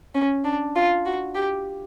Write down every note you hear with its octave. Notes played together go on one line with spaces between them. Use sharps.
C#4
D4
F4
F#4
G4